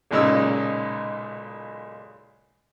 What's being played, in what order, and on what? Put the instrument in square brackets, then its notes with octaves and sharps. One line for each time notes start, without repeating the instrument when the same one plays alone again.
[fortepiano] B1 A#2 C#3 G#3 D#4 E6